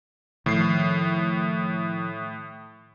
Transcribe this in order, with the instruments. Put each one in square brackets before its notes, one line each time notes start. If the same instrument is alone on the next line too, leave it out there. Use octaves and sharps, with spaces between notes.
[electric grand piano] A2 C7 [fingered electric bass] D#3 F3